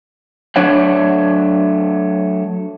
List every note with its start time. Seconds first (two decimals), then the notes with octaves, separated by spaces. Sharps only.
0.56 F#3 A3 D4 C#5 F#5